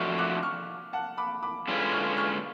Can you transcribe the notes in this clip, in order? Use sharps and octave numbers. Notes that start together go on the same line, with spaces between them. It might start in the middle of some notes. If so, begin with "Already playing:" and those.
Already playing: F2 F3 A3 D4 F#4 C#6 F6
D6 F#6
C#6 F6
F#5 A5
B5 D6
B5 D6
D3 G#3 C#4 F4 B4
C#6 F6
C#6 F6